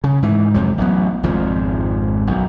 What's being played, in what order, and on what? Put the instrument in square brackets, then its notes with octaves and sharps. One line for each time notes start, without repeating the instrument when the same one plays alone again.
[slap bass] C#3
G#2 E3
F2 G#2 C3 F#3
A1 F#3 B3
G#1 F2 G#2 F3
B1 F#2